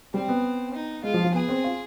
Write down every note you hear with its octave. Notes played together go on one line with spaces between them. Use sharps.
G3 C4
B3
D#4
G#3 F4
F3
F3
B3 G#4
C4
F4